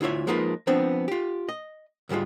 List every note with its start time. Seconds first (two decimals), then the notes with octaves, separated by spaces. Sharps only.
0.01 D2 E4 F4 C#5 E5
0.27 F3 G#3 A#3 D#4 F4 B4
0.67 F3 B3 C4 D4
1.08 F4 G4
1.49 D#5
2.09 D2 G#2 G3 G#3 F4